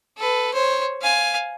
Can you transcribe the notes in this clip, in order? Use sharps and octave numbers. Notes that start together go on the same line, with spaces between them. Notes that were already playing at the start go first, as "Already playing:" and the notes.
A4 B4
C5 C#5
F5 G#5